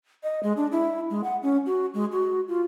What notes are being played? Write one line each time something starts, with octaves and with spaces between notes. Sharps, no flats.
D#5
G#3
D4
E4
G#3
F#5
C#4
F#4
G#3
F#4
F4